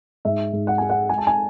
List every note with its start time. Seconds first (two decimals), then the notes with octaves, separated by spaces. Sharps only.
0.25 G#2 E5
0.53 G#2
0.67 F#5
0.78 G#3 G#5
0.89 F#5
1.09 G#3 G#5
1.18 A5
1.27 G#5